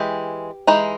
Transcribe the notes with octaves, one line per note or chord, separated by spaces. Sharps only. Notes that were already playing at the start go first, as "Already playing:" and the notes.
Already playing: E3 G#3 G4
E3 G#3 D#4